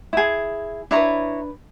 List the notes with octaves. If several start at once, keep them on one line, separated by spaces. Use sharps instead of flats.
E4 G#4
D4 E4 B4 C#5 A#5